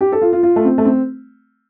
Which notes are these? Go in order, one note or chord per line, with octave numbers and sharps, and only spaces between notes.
G4
A4
F4
F4
F4
A3
C4
A3
C4